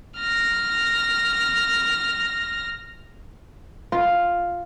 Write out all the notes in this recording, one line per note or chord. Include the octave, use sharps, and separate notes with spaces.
F6 A#6
F4